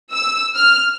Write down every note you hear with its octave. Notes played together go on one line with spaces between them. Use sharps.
E6
F6